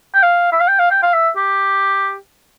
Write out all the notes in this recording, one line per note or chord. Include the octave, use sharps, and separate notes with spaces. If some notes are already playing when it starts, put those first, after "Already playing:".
G5
F5
E5
F5
G5
F5
G5
F5
E5
G4